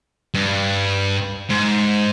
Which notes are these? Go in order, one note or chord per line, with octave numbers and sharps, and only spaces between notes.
G2
G#2